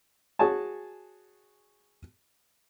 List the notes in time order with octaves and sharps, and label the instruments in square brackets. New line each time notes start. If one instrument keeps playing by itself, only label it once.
[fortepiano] F#4 G#4 C#5 G#5 A5